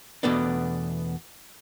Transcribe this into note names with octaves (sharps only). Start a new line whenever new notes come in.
E2 B2 A3 B3 D4